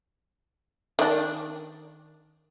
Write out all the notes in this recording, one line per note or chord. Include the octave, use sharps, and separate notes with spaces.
D#3 D4